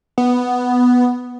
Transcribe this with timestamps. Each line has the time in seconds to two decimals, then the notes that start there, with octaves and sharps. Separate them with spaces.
0.18 B3